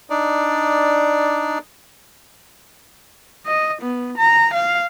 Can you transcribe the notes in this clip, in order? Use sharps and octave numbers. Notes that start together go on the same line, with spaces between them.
D4 D#4 D5
D#5
B3
A#5
F5